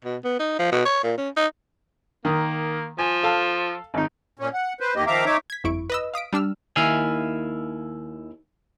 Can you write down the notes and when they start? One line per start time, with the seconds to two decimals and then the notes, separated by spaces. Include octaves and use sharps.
0.05 B2
0.24 B3
0.39 D#4
0.59 F3
0.72 B2
0.85 C#5
1.03 A#2
1.18 C#4
1.37 D#4
2.25 D#3 A#3 D#6
2.99 F3 G#5
3.23 A4 F5 A5
3.94 G#1 D#4
4.39 A#2 C#4
4.54 F#5
4.80 B4 C5
4.96 E2 D#3 A#3 G4 D#5
5.07 D#3 F3 E5 F5 A#5 D6
5.26 D#4 C#5 E5 D6
5.50 G#6 B6
5.64 G1 F2 E4 C#6 D7
5.90 B4 D#5 E6
6.14 F5 D#6 B6 D7
6.33 G3 D4 E6 F6
6.76 D#2 D#3 E4 E5 F5 G#5